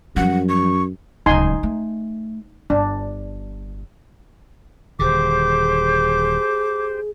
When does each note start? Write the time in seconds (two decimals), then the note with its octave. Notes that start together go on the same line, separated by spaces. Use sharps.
0.16 F#2 F3 G3 F#5
0.49 C#6
1.26 D1 C#2 D#4 G#5 C6
1.63 A3
2.70 G1 D4
4.99 D#1 D3 G4 G#4 C5 D6